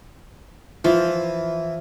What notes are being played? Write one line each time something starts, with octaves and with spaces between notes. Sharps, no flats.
E3 F3